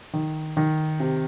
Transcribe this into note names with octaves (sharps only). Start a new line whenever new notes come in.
D#3
D#3
C3